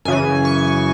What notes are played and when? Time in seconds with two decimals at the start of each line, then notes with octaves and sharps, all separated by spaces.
0.05 F#2 C#3 E3 G#5
0.45 C#6